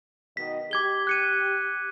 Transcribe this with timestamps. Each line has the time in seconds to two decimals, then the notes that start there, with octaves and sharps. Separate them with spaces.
0.37 B2 D#3 D#5 B6
0.71 G4 D6 G#6 G7
1.07 F#6 C#7 D#7